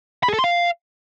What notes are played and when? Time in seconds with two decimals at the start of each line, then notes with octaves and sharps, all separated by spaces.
0.23 B5
0.28 G#4
0.33 A4
0.39 C6
0.44 F5